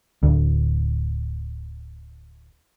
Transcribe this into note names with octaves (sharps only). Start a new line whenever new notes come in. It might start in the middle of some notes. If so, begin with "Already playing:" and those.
D1 D2